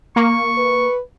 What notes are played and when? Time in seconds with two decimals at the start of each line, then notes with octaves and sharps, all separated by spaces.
0.16 A#3 C#6
0.58 B4